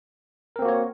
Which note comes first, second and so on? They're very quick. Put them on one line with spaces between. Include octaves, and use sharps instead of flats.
A#4 C4 A#3 F#4 C#5